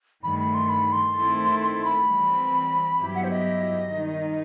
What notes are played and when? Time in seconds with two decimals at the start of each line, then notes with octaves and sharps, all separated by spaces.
0.23 G2 D#3 A3 B5
0.39 B5
0.54 C6
0.69 B5
0.92 C6
1.15 D#3 A3 C4 E4 A4
1.62 C6
1.85 B5
2.07 E3 G3 C4
2.99 G2 F#3 B3 E4 G4
3.15 F#5
3.24 C5
3.31 D#5
3.91 D#3 G3 D#4